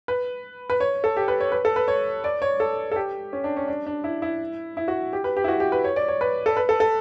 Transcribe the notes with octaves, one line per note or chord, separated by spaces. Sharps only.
B4
B4
C#5
A4
G4
B4
C#5
B4
A4
B4
C#5
D5
C#5
A4
A4
G4
C#4
D4
C#4
D4
D4
E4
E4
E4
F#4
G4
B4
G4
E4
F#4
G4
B4
C#5
D5
C#5
B4
A4
B4
A4
A4